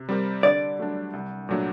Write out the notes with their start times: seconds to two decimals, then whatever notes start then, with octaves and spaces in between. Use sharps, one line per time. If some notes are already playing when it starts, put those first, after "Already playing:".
Already playing: C3
0.09 G3 C4 G4 A#4
0.43 D3 D5
0.79 F#3 A3 D4
1.13 C2
1.49 A#2 F#3 A3 D4